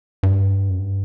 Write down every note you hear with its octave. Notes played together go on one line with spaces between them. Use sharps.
G2
F#2
G2